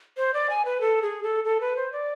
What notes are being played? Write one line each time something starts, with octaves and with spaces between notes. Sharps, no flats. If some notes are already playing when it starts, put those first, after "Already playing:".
C5
D5
G#5
B4
A4
G#4
A4
A4
B4
C5
D5